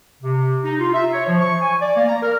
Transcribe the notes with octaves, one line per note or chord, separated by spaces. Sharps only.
C3
D#4
F4
E5
C#5
F3
C#6
G#5
D5
A#3
A#5
A#4